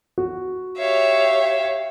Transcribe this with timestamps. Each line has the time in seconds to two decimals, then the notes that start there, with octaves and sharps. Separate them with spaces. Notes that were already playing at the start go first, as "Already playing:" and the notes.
0.18 F#4
0.77 G4 C#5 E5 F5